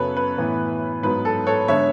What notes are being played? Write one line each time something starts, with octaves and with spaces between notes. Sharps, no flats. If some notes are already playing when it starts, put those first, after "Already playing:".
Already playing: F#2 C#3 F#3 B3 A4 B4 C#5
B4
A2 E3 B3
G#2 F#3 B3 B4
A4
A4 C#5
D3 G#3 B3 C#5 E5